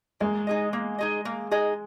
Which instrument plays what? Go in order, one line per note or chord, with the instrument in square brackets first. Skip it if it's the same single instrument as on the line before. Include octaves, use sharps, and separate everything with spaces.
[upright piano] G#3 [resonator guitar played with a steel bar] A#3
[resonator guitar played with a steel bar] D#4 G#4 D#5
A#3
D#4 G#4 D#5
A#3
D#4 G#4 D#5